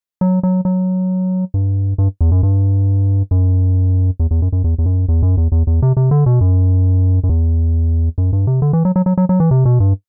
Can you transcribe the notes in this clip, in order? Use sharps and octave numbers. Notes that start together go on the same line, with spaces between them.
F#3
F#3
F#3
G2
G2
E2
F#2
G2
F#2
E2
E2
F#2
F#2
E2
E2
F#2
E2
F#2
E2
E2
E2
C3
C3
D3
B2
F#2
F#2
E2
F#2
G2
C3
D3
E3
F#3
F#3
F#3
F#3
F#3
E3
C3
B2
G2